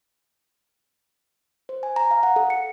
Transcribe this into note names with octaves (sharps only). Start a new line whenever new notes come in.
C5
G#5
A#5
F5
F#5
A4
C#7